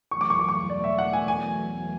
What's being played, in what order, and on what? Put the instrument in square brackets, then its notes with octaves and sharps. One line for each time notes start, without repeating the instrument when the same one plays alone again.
[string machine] E2 B2 F#3 A3 [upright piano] C#6
[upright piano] D6
C#6
D6
C#6
D5
E5
F#5
G#5
G#5